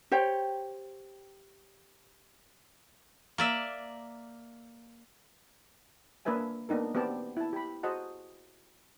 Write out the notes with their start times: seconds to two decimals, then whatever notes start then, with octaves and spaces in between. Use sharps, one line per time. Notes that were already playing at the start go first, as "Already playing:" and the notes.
0.12 G4 C5 C#5 G5
3.38 A#3 D5 E5
6.25 A#3 D4 A#4 B4 E5 G#5
6.69 A#3 B3 D4 D#4 A#4
6.95 B3 C4 G4 D5 A5
7.37 E4 A5
7.53 G4 B5
7.83 F#4 G#4 C5 D#5 F#5 A5